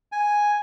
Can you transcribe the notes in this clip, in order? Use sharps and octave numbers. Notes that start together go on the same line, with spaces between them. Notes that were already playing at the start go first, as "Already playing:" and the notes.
G#5